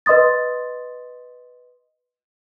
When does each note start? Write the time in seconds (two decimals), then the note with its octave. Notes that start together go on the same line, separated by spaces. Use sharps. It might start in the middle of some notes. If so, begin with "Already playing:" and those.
0.06 B4 D#5 C6 D#6 A6